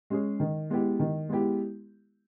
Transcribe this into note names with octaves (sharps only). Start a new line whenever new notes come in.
G#3 C#4 G#4
D#3
G#3 B3 E4 G4
D#3
G#3 B3 E4 G4